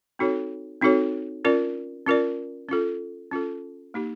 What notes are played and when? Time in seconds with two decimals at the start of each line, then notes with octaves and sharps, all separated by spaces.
0.19 C4 D#4 F#4 A4 C#5
0.81 C4 D#4 F#4 A4 C#5
1.45 C#4 F4 A#4 D5
2.06 C#4 F4 A#4 D5
2.69 C#4 F4 A4
3.31 C#4 F4 A4
3.94 A#3 D#4 G4